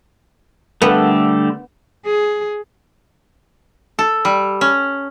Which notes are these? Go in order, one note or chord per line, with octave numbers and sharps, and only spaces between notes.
D3 G3 A3 B3
G#4
A4
G3
C#4